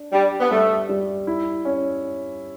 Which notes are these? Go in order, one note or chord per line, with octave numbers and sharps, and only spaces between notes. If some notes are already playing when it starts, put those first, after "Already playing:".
Already playing: D4
G3 D4
B3
G3 A3
G3
E4
C#4